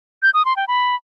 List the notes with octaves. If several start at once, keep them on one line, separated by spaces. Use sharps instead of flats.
G6
D#6
C6
G5
B5